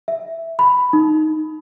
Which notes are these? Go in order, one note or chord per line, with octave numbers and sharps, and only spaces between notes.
E5
B5
D#4